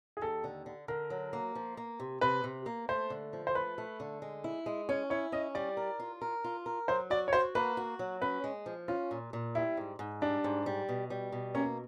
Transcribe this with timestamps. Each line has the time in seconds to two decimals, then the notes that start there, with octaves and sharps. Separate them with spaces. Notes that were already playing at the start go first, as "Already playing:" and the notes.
0.17 G#4
0.21 D#2 A4
0.44 D3
0.66 D3
0.88 D3 A#4
1.10 F#3
1.33 A#3
1.55 F3
1.77 A#3
2.00 C3
2.21 C3 B4
2.44 C3
2.66 A#3
2.89 A3 C5
3.10 D3
3.33 F3
3.47 C5
3.55 A3 B4
3.78 A3
4.00 D3
4.22 G#3
4.44 E4
4.66 G#3
4.89 C#4 C#5
5.10 E4 C#5
5.32 C#4 D#5
5.55 G3 D5
5.77 A#4
6.00 F4
6.22 A#4
6.44 F4
6.66 A#4
6.88 F#3 C5
7.10 F#4 D5
7.28 C#5
7.33 F#4 C5
7.55 A#3 B4
7.77 F#4
7.99 F#3
8.22 C#4 B4
8.44 G#3
8.66 F3
8.88 C#4 F4
9.11 A#2
9.33 A#2
9.55 G3 E4
9.77 G#2
9.99 G#2
10.22 G3 D4
10.44 G#2
10.66 G3
10.89 B2
11.10 G3
11.32 B2
11.55 A#3 C#4